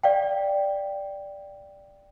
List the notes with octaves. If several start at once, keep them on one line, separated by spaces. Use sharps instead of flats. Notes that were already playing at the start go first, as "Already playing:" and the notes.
D5 F5 G5